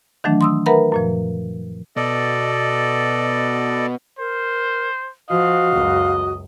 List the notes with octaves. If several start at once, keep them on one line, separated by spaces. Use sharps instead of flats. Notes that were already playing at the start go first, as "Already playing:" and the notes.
D#3 E3 F#3 A3 D4
C6 D#6 E6
A#4 B4 E5 F#5 A#5 B5
F#2 A#2 F3
B2 A4 D5 D#5
A#4 C5
F3 F#4 D#5 F5
C#2 F#2